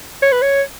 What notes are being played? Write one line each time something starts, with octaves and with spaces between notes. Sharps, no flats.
C#5
B4
C#5